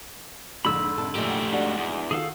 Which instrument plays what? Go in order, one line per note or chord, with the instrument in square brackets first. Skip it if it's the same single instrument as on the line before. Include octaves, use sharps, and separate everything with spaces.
[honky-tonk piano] F2 G#2 D3 [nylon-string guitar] A#3 [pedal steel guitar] B5 E6
[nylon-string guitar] C3 A4
[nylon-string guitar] F#2 A#2 D#3 [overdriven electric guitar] A3 G4
[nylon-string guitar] G#3 D4 F#4
[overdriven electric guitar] E2
[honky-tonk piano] D#3 F4 F#4 [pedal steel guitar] G#4 A4 F5